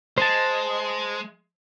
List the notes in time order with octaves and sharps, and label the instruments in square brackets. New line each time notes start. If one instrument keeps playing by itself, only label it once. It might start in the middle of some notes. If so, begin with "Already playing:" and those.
[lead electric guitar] G#3 [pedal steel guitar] C5 A5